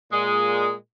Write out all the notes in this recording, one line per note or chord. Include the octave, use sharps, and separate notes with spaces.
A#2 G#3